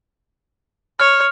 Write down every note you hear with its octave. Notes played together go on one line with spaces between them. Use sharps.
C#5 F6